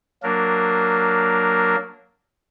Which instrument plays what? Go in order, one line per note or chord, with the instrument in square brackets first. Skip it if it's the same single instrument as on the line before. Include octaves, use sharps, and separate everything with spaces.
[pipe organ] F#3 A#3 D4 A#4